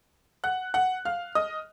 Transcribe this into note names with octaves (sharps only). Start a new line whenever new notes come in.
F#5 F#6
F#5 F#6
F5 F6
D#5 D#6